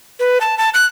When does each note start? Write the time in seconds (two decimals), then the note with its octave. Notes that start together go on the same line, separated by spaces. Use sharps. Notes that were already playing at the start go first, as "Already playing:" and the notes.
0.20 B4
0.41 A5
0.58 A5
0.74 F#6